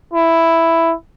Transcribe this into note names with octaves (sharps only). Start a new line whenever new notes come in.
E4